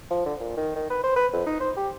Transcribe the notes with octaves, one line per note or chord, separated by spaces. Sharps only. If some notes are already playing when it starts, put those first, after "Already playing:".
F3
D3
A#2
D#3
D#3
B4
C5
B4
F2
D#4
C5
G4